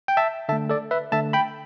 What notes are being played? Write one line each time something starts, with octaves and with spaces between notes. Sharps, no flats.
G5
E5 A5
D3 A3 E5 A5
A4 D5
B4 E5
D3 A3 E5 A5
G5 B5